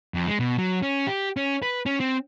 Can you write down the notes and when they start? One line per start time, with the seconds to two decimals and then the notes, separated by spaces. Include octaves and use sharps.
0.14 F2
0.27 G#3
0.40 B2
0.58 F#3
0.82 C#4
1.07 G4
1.37 C#4
1.62 B4
1.86 C#4
2.00 C4